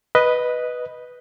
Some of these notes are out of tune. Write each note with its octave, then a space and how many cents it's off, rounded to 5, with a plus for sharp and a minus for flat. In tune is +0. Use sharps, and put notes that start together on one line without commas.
B4 +0 D#5 +0